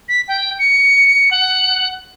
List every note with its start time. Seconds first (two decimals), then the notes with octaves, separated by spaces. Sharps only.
0.09 B6
0.28 G5
0.59 C#7
1.31 F#5